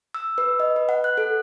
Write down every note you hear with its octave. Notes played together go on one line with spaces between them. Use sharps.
E6
B4
D#5
B4
F#5
F#6
A4